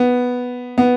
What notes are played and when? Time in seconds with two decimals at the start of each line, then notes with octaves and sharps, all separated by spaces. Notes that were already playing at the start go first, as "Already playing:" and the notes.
Already playing: B3
0.78 B3